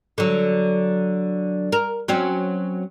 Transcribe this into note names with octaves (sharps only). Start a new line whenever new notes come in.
D3 F#3
A#4
F#3 C4 C#4